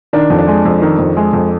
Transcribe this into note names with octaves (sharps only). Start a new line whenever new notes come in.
D#3 D4
F2
D4
G#3
F2
D#3
F2
G#3
F2